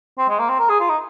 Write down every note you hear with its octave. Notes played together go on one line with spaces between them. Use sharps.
C4
G#3
A#3
C4
A#4
G#4
F4
D#4